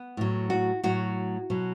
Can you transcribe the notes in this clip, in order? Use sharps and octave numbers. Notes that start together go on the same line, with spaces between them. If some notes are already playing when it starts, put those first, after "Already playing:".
Already playing: B3
A2 F#3
F#4
A2 F#3 F#4
B2 F#3